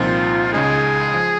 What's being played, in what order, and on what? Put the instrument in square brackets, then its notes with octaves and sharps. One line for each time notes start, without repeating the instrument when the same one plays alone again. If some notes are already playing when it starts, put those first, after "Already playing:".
Already playing: [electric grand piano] C2 A#2 F3 C4 D#4 [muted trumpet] F4
[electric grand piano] C#2 C#3 G#3 D#4 [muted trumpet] G#4
[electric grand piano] F3